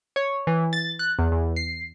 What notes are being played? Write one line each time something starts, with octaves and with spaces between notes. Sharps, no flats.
C#5
E3
A6
F#6
E2
E2
C7